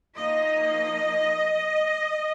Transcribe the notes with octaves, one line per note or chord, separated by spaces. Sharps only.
F3 A#3 D#4 D#5